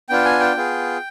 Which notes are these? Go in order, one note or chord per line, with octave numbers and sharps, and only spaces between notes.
B3 D4 F4 G5
G#5
G5
B3 F4 G#4